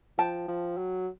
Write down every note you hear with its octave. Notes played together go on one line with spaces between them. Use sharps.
F3 G5 A5
F3
F#3